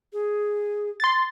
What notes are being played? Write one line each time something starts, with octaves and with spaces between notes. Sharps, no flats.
G#4
C6 A6